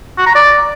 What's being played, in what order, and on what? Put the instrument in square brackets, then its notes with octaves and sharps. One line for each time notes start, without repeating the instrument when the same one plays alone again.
[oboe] F#4
A#5
D5